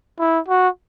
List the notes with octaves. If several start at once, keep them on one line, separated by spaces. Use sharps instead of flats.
E4
F#4